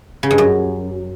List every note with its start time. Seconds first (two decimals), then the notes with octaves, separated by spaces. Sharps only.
0.23 C#3
0.31 G2
0.38 F#2